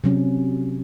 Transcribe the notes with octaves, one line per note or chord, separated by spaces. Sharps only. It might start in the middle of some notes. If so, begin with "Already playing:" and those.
C3 F#3 C#4